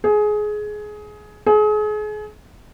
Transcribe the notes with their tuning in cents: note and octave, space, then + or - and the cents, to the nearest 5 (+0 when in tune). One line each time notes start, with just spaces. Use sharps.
G#4 +20
G#4 +35